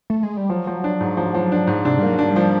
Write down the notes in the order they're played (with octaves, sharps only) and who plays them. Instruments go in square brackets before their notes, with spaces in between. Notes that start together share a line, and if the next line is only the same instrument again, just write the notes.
[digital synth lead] A3
G#3
G3
[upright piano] F3 [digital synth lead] F#3
[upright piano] F3
D4
G#2
F3
F3
D4
G#2
[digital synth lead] C3 [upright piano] D4
[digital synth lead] G3 [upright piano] A#3
[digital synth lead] F#3
[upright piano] D4
[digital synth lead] G3
[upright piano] F3